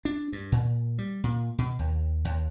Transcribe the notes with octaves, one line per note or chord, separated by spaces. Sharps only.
D4
G2
A#2
G3
A#2
B2
D#2
D#2